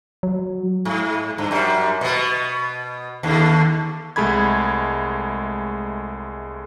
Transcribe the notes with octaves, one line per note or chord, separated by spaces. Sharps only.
F#3
G#2
G2
F#2 G3
B2 B3
D#2 D3
C2 G#3 A3 B5 G#6